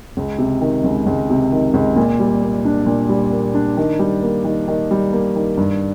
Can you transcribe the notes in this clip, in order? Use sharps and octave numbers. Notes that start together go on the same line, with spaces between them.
C#2
C3
D#3
C#2
C#2
C3
D#3
C#2
A#2
G3
A#3
D4
A#2
G3
A#3
D4
D#3
G3
A#3
D#3
D#3
G3
A#3
D#3
G2